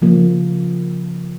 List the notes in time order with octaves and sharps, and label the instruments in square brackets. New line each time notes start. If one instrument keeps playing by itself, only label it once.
[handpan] C#3 F3 A#3